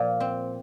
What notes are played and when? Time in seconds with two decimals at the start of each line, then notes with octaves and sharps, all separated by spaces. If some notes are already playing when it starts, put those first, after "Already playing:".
Already playing: A#2 F3 F4
0.20 C4